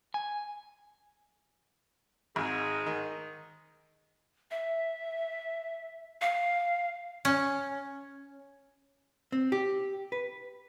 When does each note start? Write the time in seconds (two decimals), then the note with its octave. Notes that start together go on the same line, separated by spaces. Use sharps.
0.14 G#5
2.36 G#1 G#2 G#3
2.86 D#3
4.51 E5
6.21 F5
7.25 C#4
9.32 C4
9.52 G4
10.12 B4